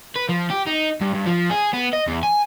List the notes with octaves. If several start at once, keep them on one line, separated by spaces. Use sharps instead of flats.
B4
F3
G4
D#4
G2
G2
F3
G#4
B3
D#5
E2
G#5